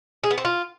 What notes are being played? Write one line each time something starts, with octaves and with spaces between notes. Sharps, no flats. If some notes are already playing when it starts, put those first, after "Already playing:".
G#4
B3
C4
F4